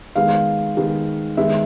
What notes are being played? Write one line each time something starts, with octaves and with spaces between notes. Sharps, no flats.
D#3 G#3 B3 F5
D#3 G#3 B3
D#3 G#3 B3 E5